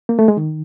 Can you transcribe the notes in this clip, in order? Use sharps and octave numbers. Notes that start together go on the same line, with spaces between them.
A#3
A3
G#3
D#3